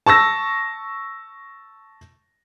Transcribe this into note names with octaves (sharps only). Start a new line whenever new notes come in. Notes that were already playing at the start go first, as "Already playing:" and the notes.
A5 C#6 E6 A#6